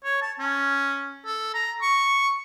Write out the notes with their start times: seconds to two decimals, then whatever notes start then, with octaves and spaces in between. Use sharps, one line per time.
0.04 C#5
0.22 A5
0.39 C#4
1.25 A4
1.54 A#5
1.82 C#6